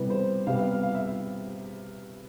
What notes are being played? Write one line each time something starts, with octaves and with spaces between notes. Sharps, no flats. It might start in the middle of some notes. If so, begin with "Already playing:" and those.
Already playing: C3 E3 G3 B3
C5
C3 G3 B3 F5
F5
F5
F5
E5